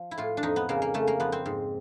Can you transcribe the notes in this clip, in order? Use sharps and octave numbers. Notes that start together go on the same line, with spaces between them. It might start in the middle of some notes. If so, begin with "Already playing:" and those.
Already playing: F3
E4
A2 F4
D4
F2 D#4
B3
C#3 A#3
A#3
C#3 A3
A#3
F2 B3
C4
G#2